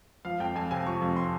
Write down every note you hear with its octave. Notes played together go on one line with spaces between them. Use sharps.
F3 F5
F2 G5
F2 G#5
C3 G#5
F3 C#6
F2
C6